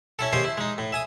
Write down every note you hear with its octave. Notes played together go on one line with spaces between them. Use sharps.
C#4 E4 A4
D#2 C#3 C#4 C5 G#5
E4
G#3 D#4
A2
E5 G#5 D#6